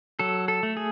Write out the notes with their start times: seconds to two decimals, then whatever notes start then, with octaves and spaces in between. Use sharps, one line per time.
0.19 F#3 A4
0.48 A4
0.63 A3
0.77 G#4